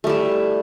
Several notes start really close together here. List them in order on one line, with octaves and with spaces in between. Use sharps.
A3 G3 E4